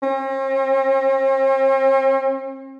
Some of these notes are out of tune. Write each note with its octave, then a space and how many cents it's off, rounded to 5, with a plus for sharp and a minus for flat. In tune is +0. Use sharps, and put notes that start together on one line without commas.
C4 +45